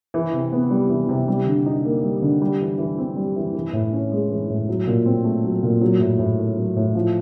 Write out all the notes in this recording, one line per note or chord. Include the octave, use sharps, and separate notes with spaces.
E3
C3
B3
G3
E3
C3
G3
D3
D#4
A#3
G3
D3
G3
E3
E3
C4
G3
E3
E3
A2
C#4
G#3
E3
A2
F#3
A#2
C4
A3
F#3
A#2
F#3
A2
A2
A3
F#3
A2
F3